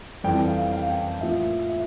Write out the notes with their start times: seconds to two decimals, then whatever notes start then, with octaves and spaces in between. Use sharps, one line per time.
0.24 F2 E3 G3 G5
0.48 F5
0.73 F5
0.88 G5
1.21 A2 F3 A#3 E5
1.69 E5